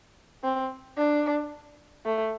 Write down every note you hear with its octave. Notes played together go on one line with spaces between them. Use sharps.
C4
D4
A3